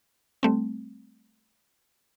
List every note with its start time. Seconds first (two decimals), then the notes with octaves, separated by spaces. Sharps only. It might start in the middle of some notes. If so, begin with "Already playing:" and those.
0.43 G3 A3 C4